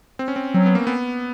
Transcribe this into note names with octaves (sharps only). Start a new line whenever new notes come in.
C4
C#4
C4
F#3 C4
B3
A#3
B3